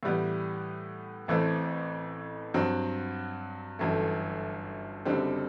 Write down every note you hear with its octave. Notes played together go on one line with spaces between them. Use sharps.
A2 E3 G3 B3
A1 A2 E3 A3 C4
G2 F#3 C4
G1 F#2 E3 A3
F#1 F#2 D3 G3 C4